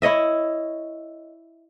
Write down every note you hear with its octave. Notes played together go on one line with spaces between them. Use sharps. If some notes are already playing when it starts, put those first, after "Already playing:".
E4 C#5 D#5 E5